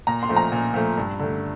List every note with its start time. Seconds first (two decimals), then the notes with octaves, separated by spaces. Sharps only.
0.07 A#2 A#5
0.23 C6
0.29 F3 A3
0.36 A#5
0.52 A#2
0.74 F3 A3
0.98 G2
1.20 D3 A3